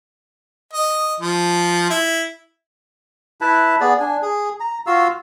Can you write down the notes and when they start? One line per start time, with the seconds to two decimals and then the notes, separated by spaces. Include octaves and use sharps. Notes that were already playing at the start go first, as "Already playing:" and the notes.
0.73 D#5
1.20 F3
1.90 E4
3.41 E4 B4 E5 A5
3.81 B3 G#4 D5
4.00 D4 G#5
4.22 G#4
4.60 A#5
4.87 F4 F#4 F5 E6